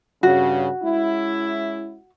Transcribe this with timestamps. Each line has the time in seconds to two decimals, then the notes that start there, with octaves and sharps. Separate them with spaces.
0.23 G2 C#3 F#4
0.83 G#3 C#4 E4